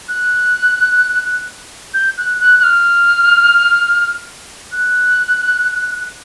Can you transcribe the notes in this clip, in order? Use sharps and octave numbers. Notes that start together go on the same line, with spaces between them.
F#6
G6
F#6
F#6
F#6
F6
F#6